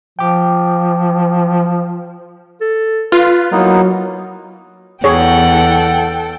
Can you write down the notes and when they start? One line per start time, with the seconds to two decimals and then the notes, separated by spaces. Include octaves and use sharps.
0.19 F3 G5 D6
2.61 A4
3.12 F4 B4
3.52 F#3 A#3 B3 D#4 E4
5.04 E2 G#4 A4 C#5 F#5 G5